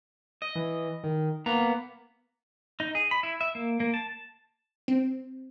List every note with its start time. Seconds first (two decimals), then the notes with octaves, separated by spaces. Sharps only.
0.42 D#5
0.55 E3
1.04 D#3
1.46 A#3 B3 A#5
2.80 D#4
2.95 G#4
3.11 B5
3.23 E4
3.41 E5
3.55 A#3
3.80 A#3
3.94 A5
4.88 C4